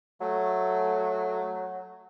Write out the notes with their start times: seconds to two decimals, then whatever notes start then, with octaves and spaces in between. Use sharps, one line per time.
0.21 F#3 A3